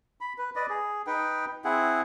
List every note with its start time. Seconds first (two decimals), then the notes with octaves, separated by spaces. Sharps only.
0.21 B5
0.38 B4
0.56 B4 D5 D#5
0.70 G#4
1.07 D#4 B4 G5
1.65 C4 E4 G#4 F#5